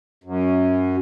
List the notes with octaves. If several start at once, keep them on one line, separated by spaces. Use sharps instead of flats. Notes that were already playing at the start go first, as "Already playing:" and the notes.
F#2